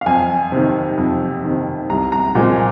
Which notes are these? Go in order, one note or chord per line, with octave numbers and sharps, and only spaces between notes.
F5
F2 G#5
C3 D#3
F2
C3 D#3
C2 A#5
A#5
A#2 F3 G#3